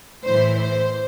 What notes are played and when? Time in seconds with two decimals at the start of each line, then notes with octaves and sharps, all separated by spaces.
0.23 A2 E3 C5
0.59 C5